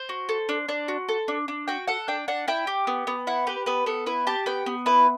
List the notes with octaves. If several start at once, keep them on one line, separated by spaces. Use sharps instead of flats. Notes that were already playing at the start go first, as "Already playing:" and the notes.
Already playing: C5
F#4
A4
D4
D4
F#4
A4
D4
D4
F#4 G5
A4 F#5
D4 G5
D4 F#5
E4 G5
G4
B3
B3
E4 F#5
G4 B4
B3 B4
B3 A4
E4 B4
G4 A5
B3 G5
B3
E4 B4